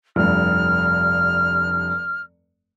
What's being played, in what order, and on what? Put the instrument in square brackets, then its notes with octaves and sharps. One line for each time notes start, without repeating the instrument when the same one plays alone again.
[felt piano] F1 G2 [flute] F6